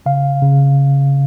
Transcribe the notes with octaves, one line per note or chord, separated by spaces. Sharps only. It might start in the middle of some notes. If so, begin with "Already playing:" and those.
C#3 F5
C#3